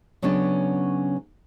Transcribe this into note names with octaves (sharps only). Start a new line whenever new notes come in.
C#3 F#3 B3 C#4 D4